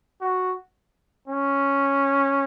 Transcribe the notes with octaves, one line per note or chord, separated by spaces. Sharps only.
F#4
C#4